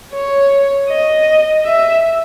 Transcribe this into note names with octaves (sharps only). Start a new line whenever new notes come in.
C#5
D#5
E5